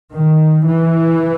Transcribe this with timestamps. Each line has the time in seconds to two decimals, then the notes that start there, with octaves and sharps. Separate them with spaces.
0.12 D#3
0.67 E3